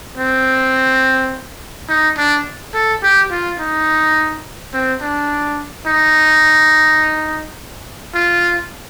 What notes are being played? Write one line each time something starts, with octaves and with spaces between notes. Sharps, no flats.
C4
D#4
D4
A4
G4
F4
D#4
C4
D4
D#4
F4